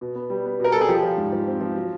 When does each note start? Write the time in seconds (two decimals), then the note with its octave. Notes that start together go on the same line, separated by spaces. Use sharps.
0.01 B2
0.15 B3
0.30 G3
0.46 B3
0.60 B2 A#4
0.72 G3 A4
0.81 G#4
0.88 F3 G4
1.03 F3
1.18 G#2
1.32 F3
1.47 C4
1.61 F3
1.76 F#3